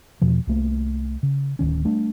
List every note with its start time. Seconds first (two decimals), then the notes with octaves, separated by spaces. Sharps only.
0.21 E2 B2 F3
0.47 C2 A3 A#3
1.23 C#3
1.59 D1 D#3 C#4
1.85 G3 A3 D4